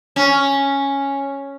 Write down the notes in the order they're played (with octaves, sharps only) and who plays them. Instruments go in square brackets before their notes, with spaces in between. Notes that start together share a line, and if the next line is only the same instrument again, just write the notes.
[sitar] C#4